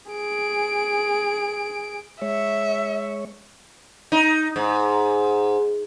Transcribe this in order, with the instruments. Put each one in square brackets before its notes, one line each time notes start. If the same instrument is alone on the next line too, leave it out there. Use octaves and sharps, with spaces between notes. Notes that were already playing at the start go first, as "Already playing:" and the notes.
[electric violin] G#4 D7
[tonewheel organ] G#3 C#5 [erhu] E5
[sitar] D#4
G#2